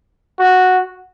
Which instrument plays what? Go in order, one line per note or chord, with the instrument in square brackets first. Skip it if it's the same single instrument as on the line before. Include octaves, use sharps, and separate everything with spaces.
[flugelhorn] F#4